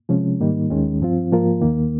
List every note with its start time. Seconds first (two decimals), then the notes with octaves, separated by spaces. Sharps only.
0.09 C3 F3 G#3 C#4
0.40 G#2 D#3 G3 A#3 D#4
0.70 D#2 D#3 G#3 C#4
1.00 G2 F3 C4 F4
1.32 G#2 F3 A#3 F4 A#4
1.62 D#2 D#3 A#3